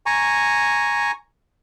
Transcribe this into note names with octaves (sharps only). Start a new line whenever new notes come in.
G#5 A#5 C#6